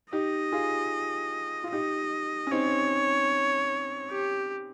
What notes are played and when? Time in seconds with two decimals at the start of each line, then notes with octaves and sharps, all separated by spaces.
0.12 D#4 G4 D#5
0.52 F4 G#4
1.64 F4
1.72 D#4 G4 D#5
2.47 C#4
2.52 C4 D#4 C#5
4.11 G4